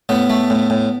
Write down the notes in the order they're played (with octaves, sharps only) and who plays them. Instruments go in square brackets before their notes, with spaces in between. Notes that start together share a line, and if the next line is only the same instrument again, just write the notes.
[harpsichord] A2 B3
A3
A2
A2